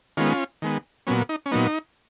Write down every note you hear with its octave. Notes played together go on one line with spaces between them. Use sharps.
D#3 G#3 B3 C#4 F4
D#3 G#3 B3
A#2 F#3 B3 C#4
D#4
C#4
A#2 F#3 B3 D#4